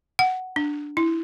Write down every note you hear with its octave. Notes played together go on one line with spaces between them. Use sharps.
F#5
D4
E4